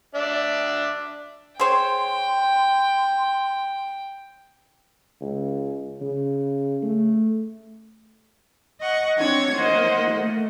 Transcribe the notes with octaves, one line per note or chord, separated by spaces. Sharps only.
D4 D5 E5
G#4 C5 C#5 G5 C6
C#2
C#3
A3
D#5 F#5 C#6
C4 D4 C#5 G#6
A#3 C5 D#5 F#5
A3